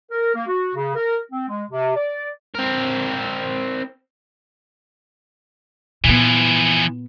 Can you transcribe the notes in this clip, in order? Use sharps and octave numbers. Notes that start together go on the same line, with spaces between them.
A#4
A#3
F#4
C#3
A#4
C4
G#3
C3
D5
C4 A#4
A#2 E3 F3 B3